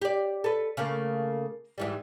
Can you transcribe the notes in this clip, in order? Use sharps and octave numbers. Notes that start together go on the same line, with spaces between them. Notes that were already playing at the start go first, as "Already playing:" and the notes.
G4 D5
A4 B4
C#3 A3 A#3
G#2 E3 G3